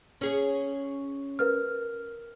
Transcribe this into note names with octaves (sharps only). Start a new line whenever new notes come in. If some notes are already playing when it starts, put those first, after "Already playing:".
C#4 G#4 C#5
A#4 B4 F6